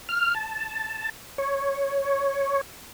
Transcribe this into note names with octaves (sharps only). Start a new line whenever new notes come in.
F6
A5
C#5